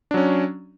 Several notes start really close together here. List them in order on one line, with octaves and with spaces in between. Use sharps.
D4 F#3 C#4